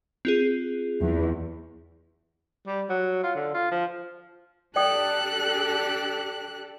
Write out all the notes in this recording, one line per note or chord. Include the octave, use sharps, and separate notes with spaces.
C4 F4 G#4
E2
G3
F#3
F4
D3
F4
F3
D4 G4 A4 D5 G5 D#6 F#6